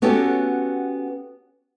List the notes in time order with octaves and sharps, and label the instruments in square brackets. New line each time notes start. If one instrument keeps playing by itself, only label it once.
[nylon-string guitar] B3 C#4 F#4 G4 A4